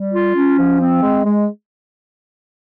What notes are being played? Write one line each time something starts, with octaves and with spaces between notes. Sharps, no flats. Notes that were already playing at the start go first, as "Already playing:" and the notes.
Already playing: G3
F4
C#4
F3
C4
G#3
G#3